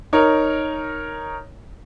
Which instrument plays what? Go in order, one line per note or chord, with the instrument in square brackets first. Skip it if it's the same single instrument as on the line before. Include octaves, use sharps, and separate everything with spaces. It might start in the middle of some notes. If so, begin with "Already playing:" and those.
[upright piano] D#4 A#4 C#5